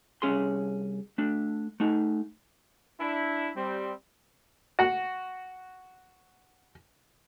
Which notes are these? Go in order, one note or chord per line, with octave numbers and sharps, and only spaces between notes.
C2 F2 C#4 G#4 C6
A3 D4
A3 D#4
D4 E4
G3 C4
F#4 F#5